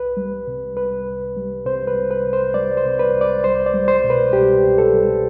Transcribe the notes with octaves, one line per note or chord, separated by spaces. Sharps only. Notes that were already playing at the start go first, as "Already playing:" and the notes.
Already playing: C2 B4
G3
C3
C2 B4
C2
G3
C3 C5
B4
C2
B4
C2
C5
G3 D5
C5
C3
B4
C2
D5
C2 C5
D5
G3
C5
B2
B4
C2 G4
C2
A4
G3